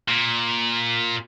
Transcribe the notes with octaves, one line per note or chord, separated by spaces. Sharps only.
A#2